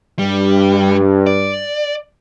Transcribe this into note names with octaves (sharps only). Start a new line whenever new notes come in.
G2 G3
D5